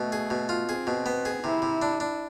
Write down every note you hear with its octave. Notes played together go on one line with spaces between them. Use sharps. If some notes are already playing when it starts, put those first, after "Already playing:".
Already playing: B2 A3
G#4
B2
F4
C4 G#4
B2
B3
G#4
C3 E4
C3
D4
D4